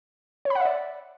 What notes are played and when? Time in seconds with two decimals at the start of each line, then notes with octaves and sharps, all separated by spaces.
0.45 C#5
0.50 B5
0.55 F#5
0.60 E5
0.65 D5